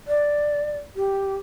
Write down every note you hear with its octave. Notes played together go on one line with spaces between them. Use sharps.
D5
G4